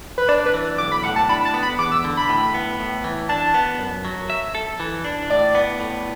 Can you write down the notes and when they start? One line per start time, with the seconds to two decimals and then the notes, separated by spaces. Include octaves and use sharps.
0.18 B4
0.29 D4 D5
0.46 B4
0.54 E3
0.78 B1 D6
0.92 B5
1.04 A2 F#5
1.16 A5
1.29 D4 B5
1.45 A5
1.54 B3
1.63 B5
1.79 E2 D6
1.92 E6
2.04 D3
2.17 B5
2.29 A2
2.54 B3
2.79 A2
3.04 E3
3.29 D4 A5
3.54 B3
3.79 F#2
4.05 F#3
4.30 E5
4.55 A4
4.80 E3
5.05 D4
5.30 A2 D5
5.55 B3
5.80 A2